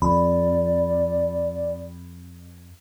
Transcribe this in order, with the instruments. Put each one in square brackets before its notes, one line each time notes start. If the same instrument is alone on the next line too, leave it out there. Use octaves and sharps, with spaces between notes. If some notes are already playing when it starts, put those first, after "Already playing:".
[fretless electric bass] F2 [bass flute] D5 [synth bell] B5